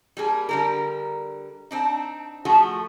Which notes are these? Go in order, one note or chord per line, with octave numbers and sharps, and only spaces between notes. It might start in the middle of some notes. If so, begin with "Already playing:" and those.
G3 A#3 G#4
D3 G3 A#4
C4 D4 D#4
F3 A3 F#4 G#4